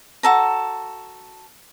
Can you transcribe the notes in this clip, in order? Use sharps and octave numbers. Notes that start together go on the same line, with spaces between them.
F#4 A4 A#5